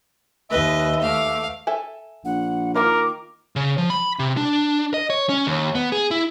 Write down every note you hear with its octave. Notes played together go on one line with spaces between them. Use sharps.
D#2 B4 D#5 E5
A3 F5 D6
A4 E5 G#5
A#1 F#5
D#3 A#3 F4 A#4 D6
C#3
F3
B5
C3
D4
D#5
C#5
C#4
D#2
B3
G#4
E4